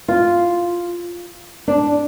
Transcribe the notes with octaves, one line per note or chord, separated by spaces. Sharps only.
F4
D4